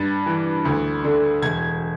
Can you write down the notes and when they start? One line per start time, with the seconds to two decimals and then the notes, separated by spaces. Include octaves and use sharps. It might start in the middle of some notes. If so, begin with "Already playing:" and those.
Already playing: G2 A6
0.26 E3
0.65 D2
1.04 D3
1.42 E1 G#6